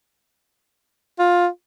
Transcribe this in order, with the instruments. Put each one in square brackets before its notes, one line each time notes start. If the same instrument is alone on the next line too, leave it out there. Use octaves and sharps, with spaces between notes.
[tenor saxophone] F4